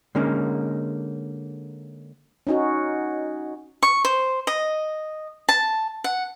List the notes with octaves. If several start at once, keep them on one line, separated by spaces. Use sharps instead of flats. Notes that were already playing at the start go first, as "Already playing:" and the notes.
D3 G#3 A#3 C#4 D#4
C#4 D#4 F#4
C#6
C5
D#5
A5
F#5